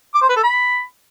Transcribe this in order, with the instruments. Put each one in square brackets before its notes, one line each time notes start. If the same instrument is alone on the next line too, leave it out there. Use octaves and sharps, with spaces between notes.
[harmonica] D6
C5
B4
A4
B5